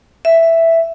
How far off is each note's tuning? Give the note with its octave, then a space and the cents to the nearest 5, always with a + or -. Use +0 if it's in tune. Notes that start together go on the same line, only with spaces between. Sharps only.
E5 +5